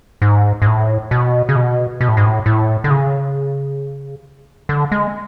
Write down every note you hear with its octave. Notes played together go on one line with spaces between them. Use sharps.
G#2
G#2
A2
B2
C#3
B2
B2
A2
G#2
A2
A2
D3
C#3
D3
G#3